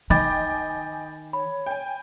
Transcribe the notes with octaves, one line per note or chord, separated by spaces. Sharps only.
D#3 D#5 G5 G#5 B5 D6 A6
C#5 B5
G5 G#5